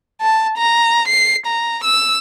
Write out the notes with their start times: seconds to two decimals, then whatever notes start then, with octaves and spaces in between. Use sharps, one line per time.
0.21 A5
0.58 A#5
1.08 C7
1.46 A#5
1.84 E6